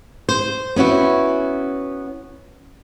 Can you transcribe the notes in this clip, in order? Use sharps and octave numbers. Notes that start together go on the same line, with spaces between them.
C5
B3 C#4 E4 F#4